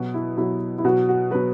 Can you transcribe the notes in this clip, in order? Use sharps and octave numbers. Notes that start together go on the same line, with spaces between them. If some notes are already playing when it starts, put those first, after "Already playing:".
Already playing: B2 F#3 F#4
E4
B2 F#3 E4
E4
B2 F#3 F#4
F#4
B2 F#3 B4